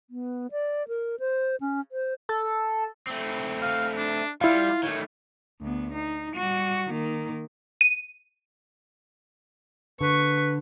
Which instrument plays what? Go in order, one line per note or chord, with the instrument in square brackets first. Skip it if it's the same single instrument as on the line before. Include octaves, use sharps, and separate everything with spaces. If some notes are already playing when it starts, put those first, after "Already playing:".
[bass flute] B3
D5
A#4
C5
C#4
C5
[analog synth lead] A4
[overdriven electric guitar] A3 C4
[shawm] F5
D4
[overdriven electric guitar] G3 [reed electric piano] E4 F5 [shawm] F4
[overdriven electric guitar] D#3 A3 [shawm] C#5
[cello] D2 B3
D#4
G3 F#4
D#3 A#3
[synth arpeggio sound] D#7
[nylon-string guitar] D3 [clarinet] B4 [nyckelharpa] C#6